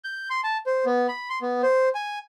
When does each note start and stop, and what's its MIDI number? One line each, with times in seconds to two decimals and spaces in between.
0.04 0.29 91
0.30 0.41 84
0.44 0.57 81
0.66 0.85 72
0.86 1.07 59
1.08 1.29 83
1.30 1.39 84
1.42 1.62 59
1.63 1.89 72
1.95 2.19 80